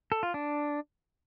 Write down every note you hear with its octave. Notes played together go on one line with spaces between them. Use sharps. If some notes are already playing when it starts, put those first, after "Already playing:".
A4
F4
D4